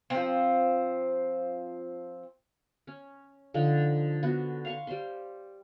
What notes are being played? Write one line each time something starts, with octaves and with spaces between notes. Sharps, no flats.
F3 C4
C#4
D3 F3 D#4
B3 F#4
F5 C6 C#6
G3 C5 C6